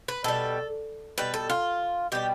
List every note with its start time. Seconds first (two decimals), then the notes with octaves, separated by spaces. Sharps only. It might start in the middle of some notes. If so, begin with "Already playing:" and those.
0.08 B4
0.24 B2 G3 A4
1.18 B2 G3 B4
1.34 A4
1.50 F4
2.12 B2 G3 G4